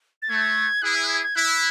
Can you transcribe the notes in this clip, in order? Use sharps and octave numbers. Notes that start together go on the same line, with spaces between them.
A6
A3 G#6
E4 G#4 F#6
E6
F#6
G#6
G#6
E4 F#6